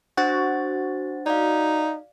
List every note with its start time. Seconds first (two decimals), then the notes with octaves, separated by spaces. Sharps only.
0.17 D4 F#4 C5 A6
1.26 D#4 D5 F5